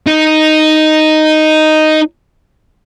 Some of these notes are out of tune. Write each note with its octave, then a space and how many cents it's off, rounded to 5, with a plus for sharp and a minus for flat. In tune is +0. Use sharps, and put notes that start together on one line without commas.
D#4 +0